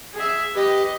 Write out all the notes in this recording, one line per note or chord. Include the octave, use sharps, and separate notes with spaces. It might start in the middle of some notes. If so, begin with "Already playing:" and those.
G#4 E5
G4 B4 D#5